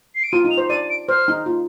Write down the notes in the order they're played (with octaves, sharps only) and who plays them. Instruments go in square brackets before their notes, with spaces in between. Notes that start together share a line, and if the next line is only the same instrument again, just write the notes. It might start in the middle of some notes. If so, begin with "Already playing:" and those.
[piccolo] C7
D7
[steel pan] F4 [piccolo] D#7
[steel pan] D#4
[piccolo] F7
[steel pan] C5
[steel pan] D5 [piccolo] D#7
[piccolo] D7
[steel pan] C5 [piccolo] F6
[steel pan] D#4
F4